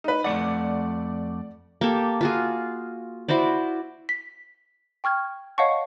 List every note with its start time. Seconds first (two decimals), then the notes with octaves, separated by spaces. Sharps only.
0.04 D#4 B4
0.24 F2 A3 D5 F#5 C#7
1.81 A#3 G4 A4
2.21 F4 F#4 G#4
3.28 E4 F#4 C5 D5
4.09 B6
5.04 G5 C#6 F6 G#6
5.58 C#5 D#5 F5 F#5 A5 C#6